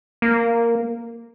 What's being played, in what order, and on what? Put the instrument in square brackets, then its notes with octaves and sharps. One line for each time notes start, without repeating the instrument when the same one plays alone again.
[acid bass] A#3